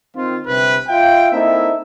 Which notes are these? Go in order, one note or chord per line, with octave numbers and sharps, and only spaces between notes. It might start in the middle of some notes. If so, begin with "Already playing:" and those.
D#3 C4 F4
G1 C3 B4
F4 E5 F5 G5
A#3 C4 D#4 E4 A4 E5